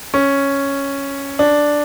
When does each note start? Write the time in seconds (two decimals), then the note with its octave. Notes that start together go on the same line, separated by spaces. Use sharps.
0.14 C#4
1.39 D4